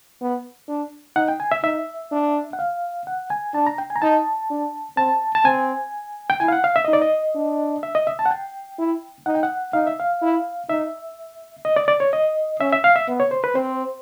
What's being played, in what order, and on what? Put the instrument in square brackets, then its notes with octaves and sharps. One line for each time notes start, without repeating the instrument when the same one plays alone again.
[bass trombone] B3
D4
[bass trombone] D#4 [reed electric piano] F#5
[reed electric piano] G5
G#5
E5
[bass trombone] D#4 [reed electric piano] E5
[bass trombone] D4
[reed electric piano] F#5
F5
F#5
G#5
[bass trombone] D4 [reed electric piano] A5
[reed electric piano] A#5
G5
G#5
A#5
[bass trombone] D#4 [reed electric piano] A5
[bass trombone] D4
[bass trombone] C4 [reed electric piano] A5
[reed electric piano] A5
[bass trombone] C4 [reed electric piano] G#5
[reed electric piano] G5
[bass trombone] E4 [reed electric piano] G#5
[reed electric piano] F5
F#5
F5
E5
[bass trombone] D#4 [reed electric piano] D#5
[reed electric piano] D5
D#5
[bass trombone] D4
[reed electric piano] E5
D#5
E5
A5
F#5
G5
[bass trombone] E4
[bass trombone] D#4 [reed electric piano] F#5
[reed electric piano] G5
F#5
[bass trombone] D#4 [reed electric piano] F5
[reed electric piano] E5
F5
[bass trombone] E4
[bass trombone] D#4 [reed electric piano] E5
[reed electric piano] D#5
D5
D5
C#5
D#5
[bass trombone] C#4 [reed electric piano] E5
[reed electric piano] E5
F5
E5
[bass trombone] B3
[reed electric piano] C#5
C5
B4
[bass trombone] C4 [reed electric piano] C5